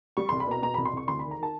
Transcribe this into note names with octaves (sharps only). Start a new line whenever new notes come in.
G3 C#6
C2 C6
B5
B2 A#5
B2 A#5
C2 B5
C6
C2 C#6
D2 C6
D#3 B5
A#5
D#3 A5